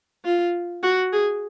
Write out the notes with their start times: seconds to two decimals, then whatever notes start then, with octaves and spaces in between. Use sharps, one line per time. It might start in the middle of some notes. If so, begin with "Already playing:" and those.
0.25 F4
0.83 F#4
1.13 G#4